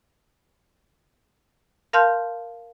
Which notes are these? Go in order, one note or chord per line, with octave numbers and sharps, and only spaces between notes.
A#4 F5 A5 C6 F6 G6